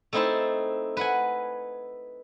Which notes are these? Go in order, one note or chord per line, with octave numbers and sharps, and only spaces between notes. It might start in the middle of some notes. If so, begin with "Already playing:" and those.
A3 C4 D#4 E4 C5 A5
B4 F#5 G#5